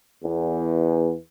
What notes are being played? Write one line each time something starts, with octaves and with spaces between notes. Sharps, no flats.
E2